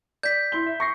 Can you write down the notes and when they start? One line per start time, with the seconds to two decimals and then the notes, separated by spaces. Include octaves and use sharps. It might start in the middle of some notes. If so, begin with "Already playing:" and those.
0.23 D5 G6 B6
0.52 E4 C6 G7
0.66 E5
0.80 C#6 A#6 C7